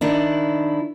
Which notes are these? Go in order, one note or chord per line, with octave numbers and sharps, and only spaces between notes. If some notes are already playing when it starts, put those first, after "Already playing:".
D#3 D4 E4